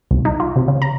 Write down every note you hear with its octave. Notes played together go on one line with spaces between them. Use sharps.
C2
D#4
F4
C3
C#3
A#5